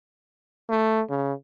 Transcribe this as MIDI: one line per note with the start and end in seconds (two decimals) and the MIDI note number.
0.70 1.02 57
1.10 1.33 49